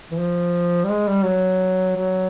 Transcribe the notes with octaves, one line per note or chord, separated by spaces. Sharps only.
E3
F3
G3
G#3
G3
F#3
F#3